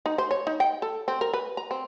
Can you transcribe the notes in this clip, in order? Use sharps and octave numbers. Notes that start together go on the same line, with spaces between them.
D#4
C5
C#5
D#4
G5
A4
C4
A#4
B4
A#5
C4